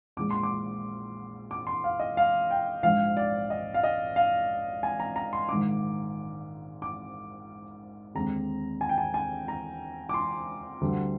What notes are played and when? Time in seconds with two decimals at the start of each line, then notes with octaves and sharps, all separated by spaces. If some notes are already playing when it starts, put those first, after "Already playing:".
0.17 A#1 A#2 F3 G#3 D6
0.31 C6
0.43 D6
1.51 D6
1.67 C6
1.84 F5
1.99 D#5
2.17 F5
2.50 G5
2.83 A#1 G#2 F3 F5
3.17 D5
3.50 D#5
3.74 F5
3.84 D#5
4.16 F5
4.83 G#5
5.00 A#5
5.16 A#5
5.33 C6
5.49 A#1 G#2 D#3 D6
6.82 D6
8.15 D#2 D3 G#3 C4 A#5
8.81 G#5
8.89 G5
8.98 G#5
9.14 G#5
9.48 A#5
10.09 D6
10.14 C6
10.81 D2 D3 G3